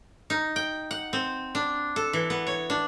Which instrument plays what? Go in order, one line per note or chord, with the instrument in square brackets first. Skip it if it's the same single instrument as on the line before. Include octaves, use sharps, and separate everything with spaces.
[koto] D#4
G5
F#5
C4
D4
A4
E3
B3
C#5
D4